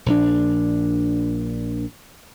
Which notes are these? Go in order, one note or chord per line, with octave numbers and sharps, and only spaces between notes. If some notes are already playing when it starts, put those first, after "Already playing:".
A#1 D4